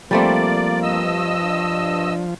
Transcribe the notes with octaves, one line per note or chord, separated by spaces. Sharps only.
F3 G3 A3 A#3 C4 D5
G2 D#5 E6
D4